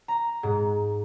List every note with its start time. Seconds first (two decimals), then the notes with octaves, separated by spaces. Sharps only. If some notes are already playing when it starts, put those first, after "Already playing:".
0.08 A#5
0.43 G#2